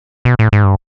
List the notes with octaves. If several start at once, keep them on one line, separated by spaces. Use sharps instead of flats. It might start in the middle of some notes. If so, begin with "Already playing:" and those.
B2
A2
G#2
G2